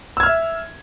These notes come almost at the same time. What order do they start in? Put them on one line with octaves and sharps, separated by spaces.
E6 G#6 F6 E5